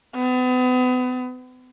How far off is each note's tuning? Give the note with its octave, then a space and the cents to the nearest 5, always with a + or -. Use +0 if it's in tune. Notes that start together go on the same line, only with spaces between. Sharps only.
B3 +35